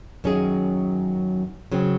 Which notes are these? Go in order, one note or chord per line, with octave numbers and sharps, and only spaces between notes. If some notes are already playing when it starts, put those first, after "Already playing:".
F#2 D#3 F#3 C#4 G#4
C#3 F#3 C4